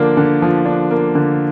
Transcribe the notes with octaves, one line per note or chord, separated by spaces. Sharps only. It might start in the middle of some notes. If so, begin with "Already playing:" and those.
Already playing: D3 F3 A#3 D4
D3
F3
D4
A#3
D3